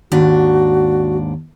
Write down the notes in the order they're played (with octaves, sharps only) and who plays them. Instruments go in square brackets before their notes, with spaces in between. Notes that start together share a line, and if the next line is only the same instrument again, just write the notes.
[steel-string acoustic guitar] D#2 G#2 D4 [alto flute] F#4